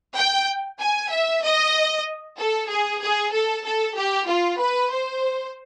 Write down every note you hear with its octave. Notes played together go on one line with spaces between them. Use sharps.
G5
G#5
E5
D#5
A4
G#4
G#4
A4
A4
G4
F4
B4
C5